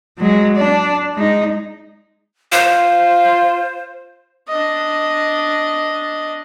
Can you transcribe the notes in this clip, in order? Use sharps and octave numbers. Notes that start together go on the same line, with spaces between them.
F#3 G#3
D4
G#3 D#4
F4 C5
D4 D#5